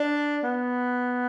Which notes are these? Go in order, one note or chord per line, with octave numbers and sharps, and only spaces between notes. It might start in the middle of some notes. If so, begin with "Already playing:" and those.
Already playing: D4
B3